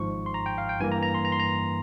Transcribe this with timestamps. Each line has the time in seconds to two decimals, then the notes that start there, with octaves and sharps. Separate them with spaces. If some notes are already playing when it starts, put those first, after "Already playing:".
Already playing: G#1 G#2 F3 C#6
0.26 C6
0.34 A#5
0.46 G5
0.58 F5
0.69 G5
0.80 G2 E3 A#3 G#5
0.92 A#5
1.03 A#5
1.14 C6
1.25 A#5
1.32 C6
1.40 A#5